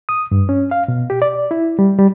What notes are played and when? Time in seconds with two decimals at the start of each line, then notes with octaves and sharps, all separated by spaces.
0.09 D#6
0.31 G2
0.49 C#4
0.71 F5
0.88 B2
1.10 G4
1.22 D5
1.51 E4
1.79 G3
1.98 G3